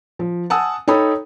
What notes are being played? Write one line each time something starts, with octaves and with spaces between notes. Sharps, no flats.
F3
F#5 G#5 A5 D#6 E6
D#4 A4 C#5 G5 B5 D#6